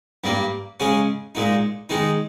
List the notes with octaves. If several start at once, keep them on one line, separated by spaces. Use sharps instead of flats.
G2 G3 A#3
C#3 G#3 C#4 G#4
A#2 G#3 D#4
D#3 G#3 D#4